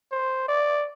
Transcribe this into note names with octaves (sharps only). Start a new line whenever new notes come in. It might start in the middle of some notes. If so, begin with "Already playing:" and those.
C5
D5